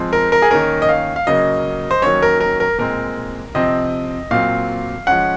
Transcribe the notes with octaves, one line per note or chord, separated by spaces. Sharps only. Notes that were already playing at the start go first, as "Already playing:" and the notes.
Already playing: F3 G#3 C4
A#4
A#4
G#4
D#3 A#3 C#4 A#4
D#5
F5
F5
C#3 F#3 A#3 D#5
C5
D#3 F#3 A#3 C#4 C#5
A#4
A#4
A#4
A#2 G#3 C4 A#4
C3 F3 C4 D#5
A#2 F#3 C4 F5
F3 G#3 C#4 F#5